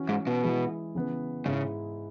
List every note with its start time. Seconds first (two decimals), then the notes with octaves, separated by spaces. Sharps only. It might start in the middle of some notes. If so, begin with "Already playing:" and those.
Already playing: E3 C#4 F#4
0.09 G#2
0.27 B2
0.43 E3 G#3 E4 G#4
0.95 C#3 E3 B3
1.46 G#2 C#3 G#3 E4